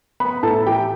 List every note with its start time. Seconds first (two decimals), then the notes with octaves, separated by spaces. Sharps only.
0.20 B3 B4 B5
0.43 A2 A4 A5
0.66 E3 G4 G5